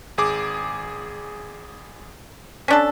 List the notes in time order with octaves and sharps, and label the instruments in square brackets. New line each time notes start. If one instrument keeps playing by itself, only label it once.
[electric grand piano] G#1 G#4 D6
[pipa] C#4 D4 A4 [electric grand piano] F#6 B6